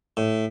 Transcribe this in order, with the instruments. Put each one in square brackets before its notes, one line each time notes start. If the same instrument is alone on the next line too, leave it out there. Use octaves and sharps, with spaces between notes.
[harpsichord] A2